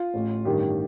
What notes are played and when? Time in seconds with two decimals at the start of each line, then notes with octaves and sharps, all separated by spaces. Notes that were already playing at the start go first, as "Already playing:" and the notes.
Already playing: F4
0.14 A1 A2
0.45 A1 G2 D#3 G4